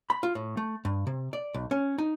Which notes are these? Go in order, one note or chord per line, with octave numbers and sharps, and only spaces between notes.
B5
F4
A2
A3
G2
C3
D5
B1
C#4
D#4